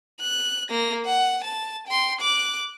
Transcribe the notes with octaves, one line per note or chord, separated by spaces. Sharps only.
F#6
A#3 A#6
F#5
A5
G5 C6
D6 F#6